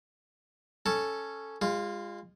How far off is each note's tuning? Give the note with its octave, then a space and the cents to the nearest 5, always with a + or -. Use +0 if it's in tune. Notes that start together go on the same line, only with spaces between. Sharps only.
C#4 +0 A4 +0 A5 +0
G#3 -35 F4 +0